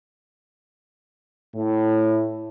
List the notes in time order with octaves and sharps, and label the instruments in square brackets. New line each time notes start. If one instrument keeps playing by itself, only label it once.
[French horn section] A2